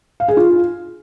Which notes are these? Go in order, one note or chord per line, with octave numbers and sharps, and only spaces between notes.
F5
G#4
F4